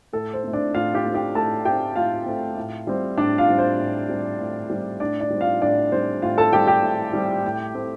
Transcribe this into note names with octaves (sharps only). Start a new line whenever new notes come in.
A2 A4
C5
A3 C4
D4 D5
A2 F4 F5
G4 G5
A3 C4
G4 G5
A2 A4 A5
A3 C4 G4 G5
A2 F4 F5
A3 C4
A2
G3 C4
A2 D4 D5
F4 F5
G3 C4
C5
A2
G3 C4
A2
G3 C4
A2 D4 D5
D4 D5
G3 C4
F4 F5
A2 D4 D5
G3 C4 C5
A2 F4 F5
A4 A5
G3 C4 G4 G5
G4 G5
A2
G3 C4
A2
A3 C4